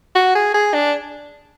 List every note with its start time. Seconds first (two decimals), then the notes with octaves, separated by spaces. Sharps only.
0.15 F#4
0.35 G#4
0.54 G#4
0.74 D4